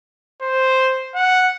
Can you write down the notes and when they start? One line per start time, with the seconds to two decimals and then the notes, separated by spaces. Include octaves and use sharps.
0.42 C5
1.15 F#5